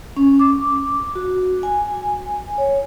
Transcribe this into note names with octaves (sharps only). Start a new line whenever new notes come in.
C#4
D6
F#4
G#5
C#5